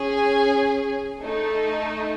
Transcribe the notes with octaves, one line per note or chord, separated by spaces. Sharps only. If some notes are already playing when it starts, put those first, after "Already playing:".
Already playing: C#4 G#4
G#5
A3 D#4 A4